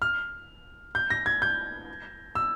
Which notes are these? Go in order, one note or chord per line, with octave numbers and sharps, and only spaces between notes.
F6
G6
A#6
G#6
G6
E6